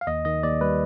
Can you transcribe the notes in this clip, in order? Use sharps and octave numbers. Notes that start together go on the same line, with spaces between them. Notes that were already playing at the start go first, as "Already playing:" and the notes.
F5
D#2 D#5
D#3 D#5
D#2 D5
G3 B4